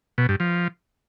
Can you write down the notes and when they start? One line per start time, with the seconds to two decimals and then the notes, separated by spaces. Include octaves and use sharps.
0.18 B2
0.29 G2
0.40 F3